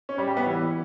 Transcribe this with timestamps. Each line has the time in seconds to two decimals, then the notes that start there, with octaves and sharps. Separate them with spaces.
0.09 C#4
0.18 G3
0.27 G4
0.37 B3
0.46 E3